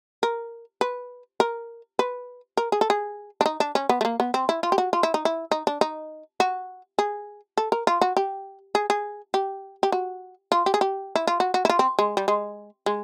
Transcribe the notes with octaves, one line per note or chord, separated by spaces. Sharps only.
A#4
B4
A#4
B4
A#4
G#4
A4
G#4
D4
D#4
D4
C#4
B3
A3
A#3
B3
C4
E4
F4
G4
F#4
F4
E4
D#4
E4
D#4
D4
D#4
F#4
G#4
A4
A#4
F4
F#4
G4
G#4
G#4
G4
G4
F#4
F4
G4
G#4
G4
E4
F4
F#4
F#4
E4
F4
C4
G#3
G3
G#3
G#3